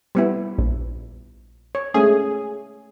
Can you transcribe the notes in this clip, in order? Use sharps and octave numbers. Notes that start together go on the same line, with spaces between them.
G3 B3 E4
A#1
C#5
G#3 A3 C#4 G#4